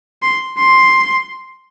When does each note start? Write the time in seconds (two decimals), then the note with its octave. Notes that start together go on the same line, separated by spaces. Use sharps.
0.23 C6
0.59 C6